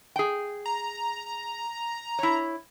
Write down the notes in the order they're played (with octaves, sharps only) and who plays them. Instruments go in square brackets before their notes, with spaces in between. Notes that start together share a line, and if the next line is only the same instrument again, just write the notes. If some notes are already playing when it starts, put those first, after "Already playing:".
[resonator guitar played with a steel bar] G#4 G5
[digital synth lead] A#5
[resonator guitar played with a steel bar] E4 C#5